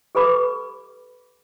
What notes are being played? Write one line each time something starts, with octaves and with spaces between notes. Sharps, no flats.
G4 A4 B4 B5 D6